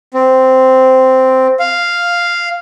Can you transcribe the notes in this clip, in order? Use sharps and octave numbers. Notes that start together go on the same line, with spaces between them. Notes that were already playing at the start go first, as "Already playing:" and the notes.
C4
F5